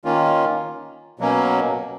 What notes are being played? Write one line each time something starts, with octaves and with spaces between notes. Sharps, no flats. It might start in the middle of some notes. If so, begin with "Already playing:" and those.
D#3 A#3 C#4 F4
B2 F#3 A#3 C#4